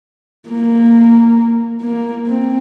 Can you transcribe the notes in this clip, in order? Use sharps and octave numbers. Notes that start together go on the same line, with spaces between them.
A#3
A#3
C4